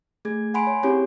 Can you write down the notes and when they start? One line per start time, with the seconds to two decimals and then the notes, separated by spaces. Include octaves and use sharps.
0.25 A3 G#4 G#6
0.54 F#5 G#5 B5 C6 D7
0.67 C#5
0.83 C4 C#4 E4 G4 G#4 C#5